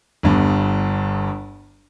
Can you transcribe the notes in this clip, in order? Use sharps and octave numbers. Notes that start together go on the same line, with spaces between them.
G1 G2 B3